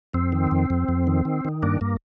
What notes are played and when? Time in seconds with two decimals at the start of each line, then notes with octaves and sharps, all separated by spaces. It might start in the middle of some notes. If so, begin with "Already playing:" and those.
0.14 F2 C4
0.32 D#3
0.51 F2
0.70 F2
0.88 F2
1.07 D#3
1.25 D#3
1.45 D#3
1.63 G2 A#3 D4
1.81 G2 A#3